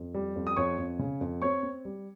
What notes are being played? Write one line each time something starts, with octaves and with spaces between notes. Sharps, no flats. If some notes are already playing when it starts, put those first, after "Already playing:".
Already playing: F2
G3
F2
D#6
F2 C#5 C#6
F2
C#3
F2
C4 C#5 C#6
C4
G3